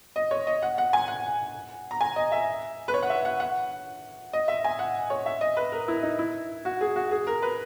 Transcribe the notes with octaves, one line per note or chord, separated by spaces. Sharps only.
D#5
C#5
D#5
F#5
F#5
G#5
F#5
A#5
G#5
D#5
E5
B4
C#5
F#5
E5
F#5
F#5
D#5
E5
G#5
F#5
C#5
E5
D#5
B4
A#4
E4
D#4
E4
F#4
G#4
F#4
G#4
A#4
B4